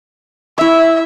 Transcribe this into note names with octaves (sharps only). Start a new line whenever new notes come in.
E4 C#5 E5